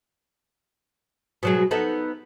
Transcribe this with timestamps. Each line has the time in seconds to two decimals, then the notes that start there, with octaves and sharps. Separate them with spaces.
1.43 B2 F#3 G#3
1.71 B3 D#4 A4